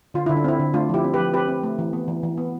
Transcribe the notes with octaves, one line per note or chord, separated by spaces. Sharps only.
D3 F4
D3 E4
D4
C4 E4
D3
A3 D4 F4
F3 E4 G4
C4
G4 B4
F3
C4 G4 B4
C4
A3
E3
B3
E3
E3
B3